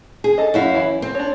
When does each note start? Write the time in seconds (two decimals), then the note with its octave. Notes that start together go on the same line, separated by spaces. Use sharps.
0.24 G#4
0.38 A4 D#5
0.54 F#2 E4 F5
0.75 E3
1.02 C4
1.15 D4 C#5